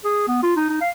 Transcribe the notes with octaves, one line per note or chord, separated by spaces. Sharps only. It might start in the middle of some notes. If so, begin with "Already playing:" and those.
G#4
B3
F4
D#4
D#4
F5